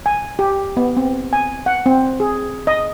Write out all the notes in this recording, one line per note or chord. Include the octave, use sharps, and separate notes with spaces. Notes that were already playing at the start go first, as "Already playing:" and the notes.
G#5
G4
B3
C4
G#5
F#5
C4
G#4
D#5